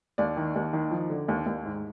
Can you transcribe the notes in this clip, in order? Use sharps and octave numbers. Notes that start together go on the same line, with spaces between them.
D#2 D5
D#3
D#2
D#3
F3
D3
D#2
D#2
G#2